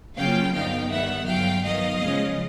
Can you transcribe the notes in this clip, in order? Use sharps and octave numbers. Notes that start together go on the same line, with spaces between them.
C#3 F#3 A#3 C#4 F4 F5 G5
G2 D3 F#3 B3 D#4 F5 G5
D#3 G3 B3 E5 F#5
G2 D3 F#3 F5 G5
D#3 F#3 B3 D#5 F5
C#3 F3 G#3 C#4